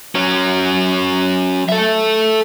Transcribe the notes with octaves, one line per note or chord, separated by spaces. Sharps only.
F#3 C#4
A4 E5